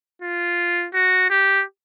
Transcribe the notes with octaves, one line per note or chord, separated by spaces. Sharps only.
F4
F#4
G4